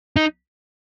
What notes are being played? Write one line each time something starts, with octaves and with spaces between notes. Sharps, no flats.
D#4